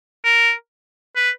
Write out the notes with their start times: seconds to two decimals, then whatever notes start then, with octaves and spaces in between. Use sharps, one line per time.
0.25 A#4
1.16 B4